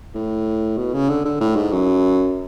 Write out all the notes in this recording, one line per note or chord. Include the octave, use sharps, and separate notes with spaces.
A2
B2
C#3
D3
D3
A2
G#2
F#2